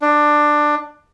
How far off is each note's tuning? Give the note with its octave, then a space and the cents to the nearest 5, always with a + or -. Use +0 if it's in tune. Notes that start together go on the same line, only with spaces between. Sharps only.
D4 +15